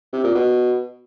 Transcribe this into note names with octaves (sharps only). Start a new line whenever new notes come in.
C3
A#2
B2